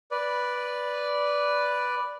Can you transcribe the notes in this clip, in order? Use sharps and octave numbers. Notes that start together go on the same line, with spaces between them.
B4 D5